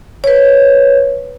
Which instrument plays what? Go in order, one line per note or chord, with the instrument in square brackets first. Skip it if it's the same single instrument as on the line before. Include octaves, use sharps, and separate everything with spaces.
[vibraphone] B4 C#5